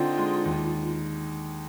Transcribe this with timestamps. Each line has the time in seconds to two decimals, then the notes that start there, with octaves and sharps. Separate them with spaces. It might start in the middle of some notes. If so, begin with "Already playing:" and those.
Already playing: D3 C4 D#4 F4
0.18 G#3
0.45 D#2